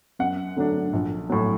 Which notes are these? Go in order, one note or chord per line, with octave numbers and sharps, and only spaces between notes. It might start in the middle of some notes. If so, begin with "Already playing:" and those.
F#2 F#5
D3 F#3 A3 D4
A#1
A2 F#3